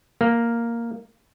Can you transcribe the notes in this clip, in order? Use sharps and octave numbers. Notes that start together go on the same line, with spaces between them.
A#3